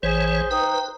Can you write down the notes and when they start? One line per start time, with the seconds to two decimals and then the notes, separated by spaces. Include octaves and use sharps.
0.03 A1 E3 G#4 C5 C#5
0.51 D#4 B4 G5 A#5 D#6